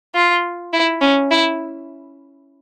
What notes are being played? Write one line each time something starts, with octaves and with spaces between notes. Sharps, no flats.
F4
E4
C#4
E4